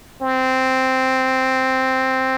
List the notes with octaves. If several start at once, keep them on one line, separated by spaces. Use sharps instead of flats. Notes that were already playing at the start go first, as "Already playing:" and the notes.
C4